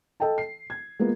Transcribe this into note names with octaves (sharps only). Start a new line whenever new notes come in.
A4 D#5 G5 A5
C7
G#6
G#3 A#3 B3 F4